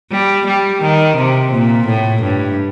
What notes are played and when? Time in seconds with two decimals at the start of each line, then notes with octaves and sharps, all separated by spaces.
0.11 G3
0.46 G3
0.81 D#3
1.16 C3
1.52 A#2
1.87 A2
2.22 G2